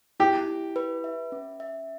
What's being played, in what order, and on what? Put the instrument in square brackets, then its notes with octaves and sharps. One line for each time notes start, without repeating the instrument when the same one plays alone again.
[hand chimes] E4 [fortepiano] G4
[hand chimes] E4
B4
E5
C#4
E5